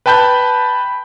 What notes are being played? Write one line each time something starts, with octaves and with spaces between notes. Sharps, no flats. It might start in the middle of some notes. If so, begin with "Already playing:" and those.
B4 G5 A5 B5 G6